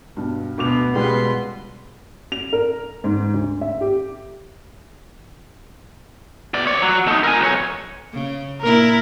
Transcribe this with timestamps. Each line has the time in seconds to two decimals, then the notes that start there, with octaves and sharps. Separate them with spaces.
0.17 G2 B2
0.58 D2 B2 B3 D6 F7
0.95 C#2 B2 G3 G#3 B4 C6
2.32 F7
2.53 A#4
3.04 G#2
3.34 D2
3.61 E5
3.81 G4
6.54 B2 D5
6.67 C#5 D5
6.82 F#3
7.08 A3 D#4
7.23 A#4 G#5
7.40 B1 C#5
8.13 C#3
8.61 A#2 E4 A#4